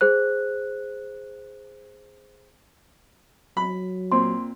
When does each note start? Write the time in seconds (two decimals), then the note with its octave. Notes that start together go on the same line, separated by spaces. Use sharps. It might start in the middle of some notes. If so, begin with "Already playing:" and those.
0.01 G#4 C5 F#6
3.57 F#3 B5
4.12 A#2 C4 C6